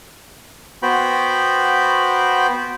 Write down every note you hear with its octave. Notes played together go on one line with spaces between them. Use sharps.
B3 F#4 C5 G5 B5